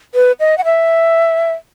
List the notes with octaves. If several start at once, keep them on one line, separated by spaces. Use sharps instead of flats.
B4
D#5
F#5
E5